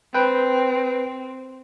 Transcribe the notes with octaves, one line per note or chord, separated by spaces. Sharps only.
C4 B4 G5